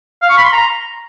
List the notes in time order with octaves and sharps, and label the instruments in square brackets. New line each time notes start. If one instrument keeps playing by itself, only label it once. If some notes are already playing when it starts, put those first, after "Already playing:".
[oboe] F5
C#6
B5
C6
A#5